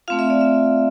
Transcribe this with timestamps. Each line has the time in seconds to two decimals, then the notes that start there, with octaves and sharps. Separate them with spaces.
0.08 A3 C4 F4 F5
0.19 E5
0.30 D5
0.41 E5